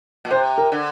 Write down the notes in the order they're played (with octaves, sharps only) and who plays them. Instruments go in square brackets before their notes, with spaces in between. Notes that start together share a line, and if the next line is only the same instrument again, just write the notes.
[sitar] A#2
[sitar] C3 [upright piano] C5
[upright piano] A#4
[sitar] D3